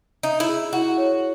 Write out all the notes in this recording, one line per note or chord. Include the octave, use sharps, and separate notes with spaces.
D#4 E5
E4
G#4
E4 F#4
C#5